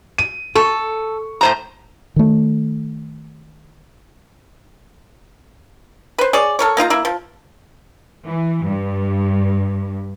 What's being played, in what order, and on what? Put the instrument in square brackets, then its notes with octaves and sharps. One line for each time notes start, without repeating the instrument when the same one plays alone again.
[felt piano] D#7
[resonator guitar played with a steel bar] A4 [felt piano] C#6
[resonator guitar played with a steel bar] A2 C5 A#5
[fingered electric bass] D#3 A3
[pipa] B4 C5
G#4 C#5 D5
A4 A#4 C#5
A#3 D#4 F4 A#5
A#3 E4
F3
[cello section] E3
G2